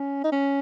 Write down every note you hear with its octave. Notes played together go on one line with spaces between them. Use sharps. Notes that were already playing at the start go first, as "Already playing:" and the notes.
Already playing: C#4
D#4
C#4